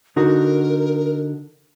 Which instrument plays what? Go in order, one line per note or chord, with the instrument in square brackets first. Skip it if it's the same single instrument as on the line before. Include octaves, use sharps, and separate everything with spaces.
[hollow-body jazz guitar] D3 D#4 F#4 [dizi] A#4